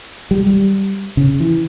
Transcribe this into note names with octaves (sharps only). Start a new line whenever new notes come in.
G3
G3
C#3
E3